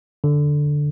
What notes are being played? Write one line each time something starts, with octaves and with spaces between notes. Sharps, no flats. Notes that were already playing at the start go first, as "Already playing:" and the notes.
D3